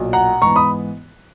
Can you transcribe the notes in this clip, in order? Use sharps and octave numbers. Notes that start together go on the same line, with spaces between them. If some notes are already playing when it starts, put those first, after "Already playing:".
Already playing: B1 A#2 F#3
F#5 A#5
G#2 E3 B3 A#5 C#6
B5 D#6